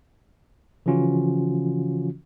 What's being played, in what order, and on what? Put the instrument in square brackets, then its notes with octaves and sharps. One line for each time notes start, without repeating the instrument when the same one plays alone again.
[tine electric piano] C#3 E3 F3 C#4 F4 F#4